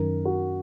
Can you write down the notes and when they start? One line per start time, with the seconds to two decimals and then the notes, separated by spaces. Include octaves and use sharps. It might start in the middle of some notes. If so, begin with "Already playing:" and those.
Already playing: F#2 D#3 A#4
0.25 F#4